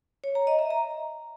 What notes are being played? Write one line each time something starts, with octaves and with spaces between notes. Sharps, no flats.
C#5
A#5
D#5
E5
A#5